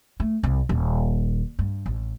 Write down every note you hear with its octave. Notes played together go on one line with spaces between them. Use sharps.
A3
C2
D#1
G2
A1